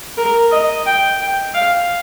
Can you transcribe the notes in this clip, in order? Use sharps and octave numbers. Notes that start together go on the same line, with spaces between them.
A#4
D#5
G5
G5
F5